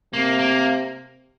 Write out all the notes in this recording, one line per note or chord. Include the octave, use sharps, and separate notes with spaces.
C3 A#3
A#3